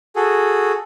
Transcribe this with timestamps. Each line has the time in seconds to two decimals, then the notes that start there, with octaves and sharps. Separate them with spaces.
0.16 F#4 G#4 A4